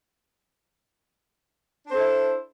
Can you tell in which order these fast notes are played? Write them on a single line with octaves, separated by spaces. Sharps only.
D4 C5 A4 E4